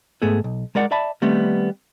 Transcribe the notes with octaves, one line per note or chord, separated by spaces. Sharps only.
G#2 A3 B3 G#4 A4
B1
G#3 A#4 D5 F#5
D5 E5 A5 B5
D#3 G3 A3 B3 C4